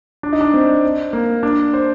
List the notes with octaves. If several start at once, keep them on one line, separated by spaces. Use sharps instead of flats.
D4
D#4
D4
C4
A#3
D4
C5